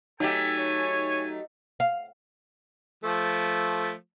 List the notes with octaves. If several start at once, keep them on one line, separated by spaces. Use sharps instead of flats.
F#3 A3 D#4 G4 A4 G#5
C#5
F5
F3 A3